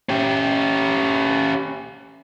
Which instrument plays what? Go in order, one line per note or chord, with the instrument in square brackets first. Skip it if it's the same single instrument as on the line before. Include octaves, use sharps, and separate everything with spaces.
[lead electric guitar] C#4 G4